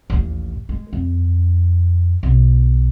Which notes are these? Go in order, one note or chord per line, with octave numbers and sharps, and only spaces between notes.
A1 D#2
G#3
F2
B1